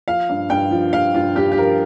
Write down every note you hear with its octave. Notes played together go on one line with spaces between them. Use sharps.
F3 F5
G2
G2 G5
F3
F3 F5
G2 F4
G2 G4
G4
F3 A#4